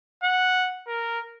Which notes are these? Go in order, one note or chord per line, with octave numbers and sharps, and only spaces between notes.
F#5
A#4